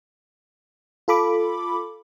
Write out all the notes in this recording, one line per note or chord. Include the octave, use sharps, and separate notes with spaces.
F4 A4 B5 D6